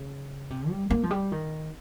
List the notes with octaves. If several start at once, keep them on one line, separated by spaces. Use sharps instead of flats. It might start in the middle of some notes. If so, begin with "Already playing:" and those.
Already playing: C#3
C3
G3
A#3
F3
G3
D#3